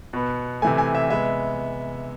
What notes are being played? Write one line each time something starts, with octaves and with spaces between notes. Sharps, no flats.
B2 B3
C3 E3 A3 G#5
G#5
E5
C3 G#3 B3 E5